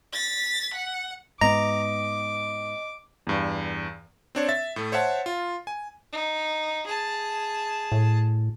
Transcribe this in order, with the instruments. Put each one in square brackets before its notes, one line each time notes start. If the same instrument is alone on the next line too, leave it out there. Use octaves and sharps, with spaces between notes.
[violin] A6 B6
F#5
[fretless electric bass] G#2 B3 [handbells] D#5 [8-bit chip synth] A#5 [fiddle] D6
[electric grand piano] E2 G2
C4 D4 C#5
E5 A6
A2 A3
C5 C#5 E5 F#5 A5
F4
G#5
[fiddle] D#4
G#4 A5
[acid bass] A2